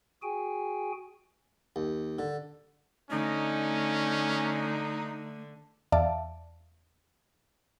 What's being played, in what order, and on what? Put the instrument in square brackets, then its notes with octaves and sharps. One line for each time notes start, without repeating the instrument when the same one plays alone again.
[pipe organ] F#4 G#4 G5 G#5
[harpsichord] D#2
D3
[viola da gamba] D3 [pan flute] A3 [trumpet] C#4 [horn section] D#4
[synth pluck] E2 D5 E5 F5 A5 D7